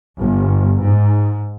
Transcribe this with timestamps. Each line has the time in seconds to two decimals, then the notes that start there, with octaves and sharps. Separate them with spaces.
0.19 G1
0.83 G#2